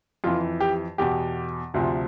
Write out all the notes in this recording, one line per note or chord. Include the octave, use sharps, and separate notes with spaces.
F2 E3 F4
G4
E2 B2 G4
D2 C3 F3